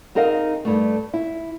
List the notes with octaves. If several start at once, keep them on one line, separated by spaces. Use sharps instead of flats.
C4 D#4 G#4 A#4 D#5 F5
G2 A3
E4